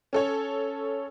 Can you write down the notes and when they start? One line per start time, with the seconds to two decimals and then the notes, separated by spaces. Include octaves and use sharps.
0.13 C#4 A4 C#5